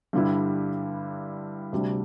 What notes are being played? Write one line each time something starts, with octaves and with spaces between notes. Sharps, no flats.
G2 D3 G3 E4
D2 C3 G3 D4